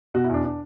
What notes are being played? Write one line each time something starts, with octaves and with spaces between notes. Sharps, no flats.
B2 F#4
E4
E2 D4
D4